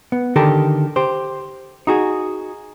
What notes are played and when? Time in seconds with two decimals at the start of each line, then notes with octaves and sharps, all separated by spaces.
0.12 B3
0.36 D3 D#3 G4 A4 A#4
0.96 G4 C5
1.87 D#4 F#4 G#4